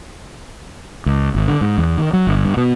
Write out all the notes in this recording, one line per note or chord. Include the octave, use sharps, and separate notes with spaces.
C#2
G#1
D3
G#2
E2
D#3
F#3
G1
G2
B2